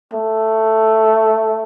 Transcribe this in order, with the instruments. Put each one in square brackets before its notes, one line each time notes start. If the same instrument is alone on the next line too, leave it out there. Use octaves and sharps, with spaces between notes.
[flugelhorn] A3